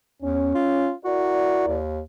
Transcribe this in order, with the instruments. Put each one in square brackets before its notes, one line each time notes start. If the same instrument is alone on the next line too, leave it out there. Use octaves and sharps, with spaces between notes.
[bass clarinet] E2 [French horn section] C#4
[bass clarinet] F4
[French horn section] E4 A#4 D5 [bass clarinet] F#4
[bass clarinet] D#2